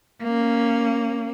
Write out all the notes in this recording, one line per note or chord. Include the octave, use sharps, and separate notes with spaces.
A#3 C#4